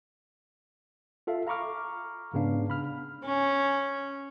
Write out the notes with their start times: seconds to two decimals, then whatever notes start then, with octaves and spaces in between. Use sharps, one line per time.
1.27 F4 A4 E5 F5
1.47 F5 A#5 B5 C#6 D6 F6
2.34 G#2 C#3 B3 D4 F5
2.70 B5 F6
3.23 C#4